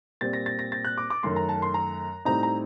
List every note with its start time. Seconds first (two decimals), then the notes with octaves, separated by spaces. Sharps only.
0.21 A#2 G3 C4 A6
0.33 A#6
0.46 A6
0.59 A#6
0.72 A6
0.85 F#6
0.98 D6
1.10 D6
1.23 F#2 D#3 A3 C6
1.36 A#5
1.49 A5
1.62 C6
1.74 A#5
2.25 A2 G3 C4 D#4 A#5
2.43 A#5